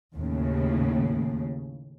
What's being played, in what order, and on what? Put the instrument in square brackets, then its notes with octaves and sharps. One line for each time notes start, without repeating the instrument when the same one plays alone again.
[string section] D#2 A2 C#3